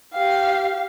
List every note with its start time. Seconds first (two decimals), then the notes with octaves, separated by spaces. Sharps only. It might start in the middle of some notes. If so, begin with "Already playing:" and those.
0.14 G4 F5